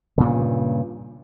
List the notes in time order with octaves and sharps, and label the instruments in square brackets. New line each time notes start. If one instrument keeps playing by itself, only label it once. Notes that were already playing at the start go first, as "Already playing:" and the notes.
[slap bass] G2 A#2 C#3